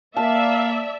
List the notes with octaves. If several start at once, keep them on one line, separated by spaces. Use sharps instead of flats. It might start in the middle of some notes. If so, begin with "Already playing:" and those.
A#3 D5 E5 F5 A5